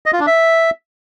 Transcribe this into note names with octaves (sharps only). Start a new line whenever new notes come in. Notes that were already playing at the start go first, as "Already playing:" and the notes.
D#5
F4
D4
E5